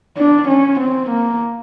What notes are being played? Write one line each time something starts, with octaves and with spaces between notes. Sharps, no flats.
D4
C#4
C4
A#3